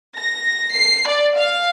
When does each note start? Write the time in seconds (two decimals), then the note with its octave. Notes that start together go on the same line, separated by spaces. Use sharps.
0.16 A#6
0.72 C7
1.07 D5
1.37 F5